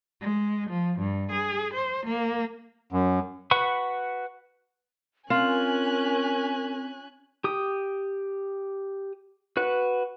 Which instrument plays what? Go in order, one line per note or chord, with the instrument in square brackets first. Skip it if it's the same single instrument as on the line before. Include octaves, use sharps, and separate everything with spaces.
[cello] G#3
F3
G2
G#4
C5
A#3
[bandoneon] F#2
[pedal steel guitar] F#4 B4 F#5 B5 C#6
[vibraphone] C4 [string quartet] C#4 G#5 F#6 [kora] F4 [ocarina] A#4
[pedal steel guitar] G4 D#6
F#4 B4 F#5